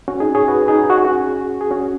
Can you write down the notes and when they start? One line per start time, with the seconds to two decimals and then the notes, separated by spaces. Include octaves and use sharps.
0.08 C#4 F#4
0.20 D#4 G#4
0.35 G#4 C#5
0.48 F#4 B4
0.68 D#4 G#4
0.90 F#4
0.97 G#4
1.05 C#4 F#4
1.61 G#4
1.71 C#4 F#4